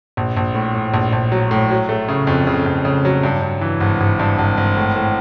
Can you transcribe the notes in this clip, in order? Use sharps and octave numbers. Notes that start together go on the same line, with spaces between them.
A#1
A#1
A2
A2
A#1
A#1
F#3
A2
F#3
A3
C#3
F2
C#3
F2
C#3
F#3
G2
G2
E3
G#1
G#1
G2
G#1
G#1
A2
A2